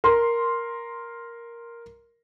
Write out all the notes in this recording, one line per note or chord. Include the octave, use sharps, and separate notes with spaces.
A#4 C6